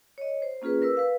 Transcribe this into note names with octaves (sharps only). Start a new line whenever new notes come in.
C#5 D#5
C5
A#3 C#4 F4 G#4 B4
A#4 B4 E6
B4 F5